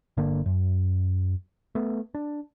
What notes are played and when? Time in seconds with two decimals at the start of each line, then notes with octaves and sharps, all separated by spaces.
0.17 G1 D3 A#3 D4
0.46 F#2
1.75 A3 B3
2.15 D4